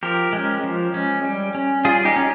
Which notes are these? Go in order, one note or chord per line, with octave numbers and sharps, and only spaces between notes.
F3 G4 A#4
G#3 C#4
F3
G#3 C#4
G3
C#4
G3 F4 G#4
D#4 G4
C#4